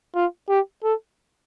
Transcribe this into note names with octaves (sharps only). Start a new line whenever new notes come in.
F4
G4
A4